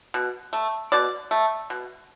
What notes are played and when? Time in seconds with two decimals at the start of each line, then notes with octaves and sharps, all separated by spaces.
0.14 B2
0.53 A3
0.92 B2 D5
1.31 A3
1.70 B2